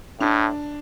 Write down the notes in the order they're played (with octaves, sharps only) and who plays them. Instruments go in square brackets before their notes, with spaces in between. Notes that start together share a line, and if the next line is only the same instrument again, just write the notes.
[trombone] A2 [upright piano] D4